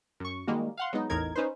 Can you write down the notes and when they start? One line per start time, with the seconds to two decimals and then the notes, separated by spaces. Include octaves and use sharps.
0.20 F#2 C#6
0.47 D#3 G3 G#3 A#3 F#4
0.77 F5 F#5 C6
0.93 F#3 G#3 B3 D#4
1.10 A1 E2 A2 D#4 A#4 G#6
1.35 C#4 D#4 B4 C5